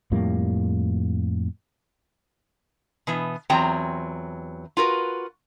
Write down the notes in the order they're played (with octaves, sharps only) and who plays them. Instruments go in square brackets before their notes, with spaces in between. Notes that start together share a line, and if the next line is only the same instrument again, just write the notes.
[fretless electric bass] F2 A2 G3 A#3
[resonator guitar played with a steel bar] B2 E3 B3
E2 F#3 C4 F4 G5 A#5
F4 F#4 A#4 B4